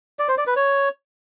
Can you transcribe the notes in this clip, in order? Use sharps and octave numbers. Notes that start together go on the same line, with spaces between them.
D5
C5
D5
B4
C#5